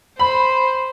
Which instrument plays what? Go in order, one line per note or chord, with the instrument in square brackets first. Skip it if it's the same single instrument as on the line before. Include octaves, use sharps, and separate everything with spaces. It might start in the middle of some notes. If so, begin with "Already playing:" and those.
[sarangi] C5 [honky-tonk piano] B5